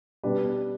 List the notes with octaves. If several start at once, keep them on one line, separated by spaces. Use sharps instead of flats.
B2 G3 D4 G4 B4